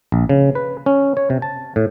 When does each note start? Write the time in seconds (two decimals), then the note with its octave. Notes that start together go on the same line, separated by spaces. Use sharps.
0.12 A#1
0.29 C#3
0.55 B4
0.86 C#4
1.17 C#5
1.30 C3
1.42 A5
1.76 A2